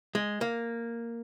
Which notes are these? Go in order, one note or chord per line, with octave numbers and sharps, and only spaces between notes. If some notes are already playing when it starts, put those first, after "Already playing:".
G#3
A#3